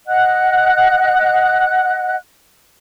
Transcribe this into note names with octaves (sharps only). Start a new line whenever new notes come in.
D#5 F#5 F#6